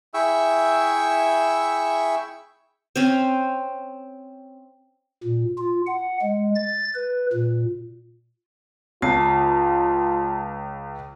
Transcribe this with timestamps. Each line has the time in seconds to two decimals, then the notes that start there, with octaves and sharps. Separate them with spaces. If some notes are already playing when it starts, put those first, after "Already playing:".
0.14 E4 G#4 E5 G5 C#6 E6
2.96 C4 C#4 C5
5.24 A#2
5.58 F4
5.87 F#5
6.22 G#3
6.55 A6
6.95 B4
7.33 A#2
9.02 C#2 F4 A5 C7